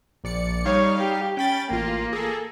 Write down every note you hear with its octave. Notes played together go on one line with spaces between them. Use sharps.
A#1 D5 C#7
G3 D#4 C#5 F5
G4
C#4 G5 B5 A6
A1 A#3 F4
G#4 A4